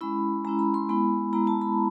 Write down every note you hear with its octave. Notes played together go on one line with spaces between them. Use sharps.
G#3 C#4 E4 B5
G#3 C#4 E4 A#5
B5
C6
G#3 B3 E4 B5
G#3 B3 E4 A#5
A5
B5